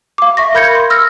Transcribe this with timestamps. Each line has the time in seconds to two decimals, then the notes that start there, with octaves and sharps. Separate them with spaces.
0.18 F5 D6
0.37 E5 C#6 A#6
0.54 A#4 B5 G6 G#6 A#6 C#7
0.75 C6
0.90 E6 F6 A#6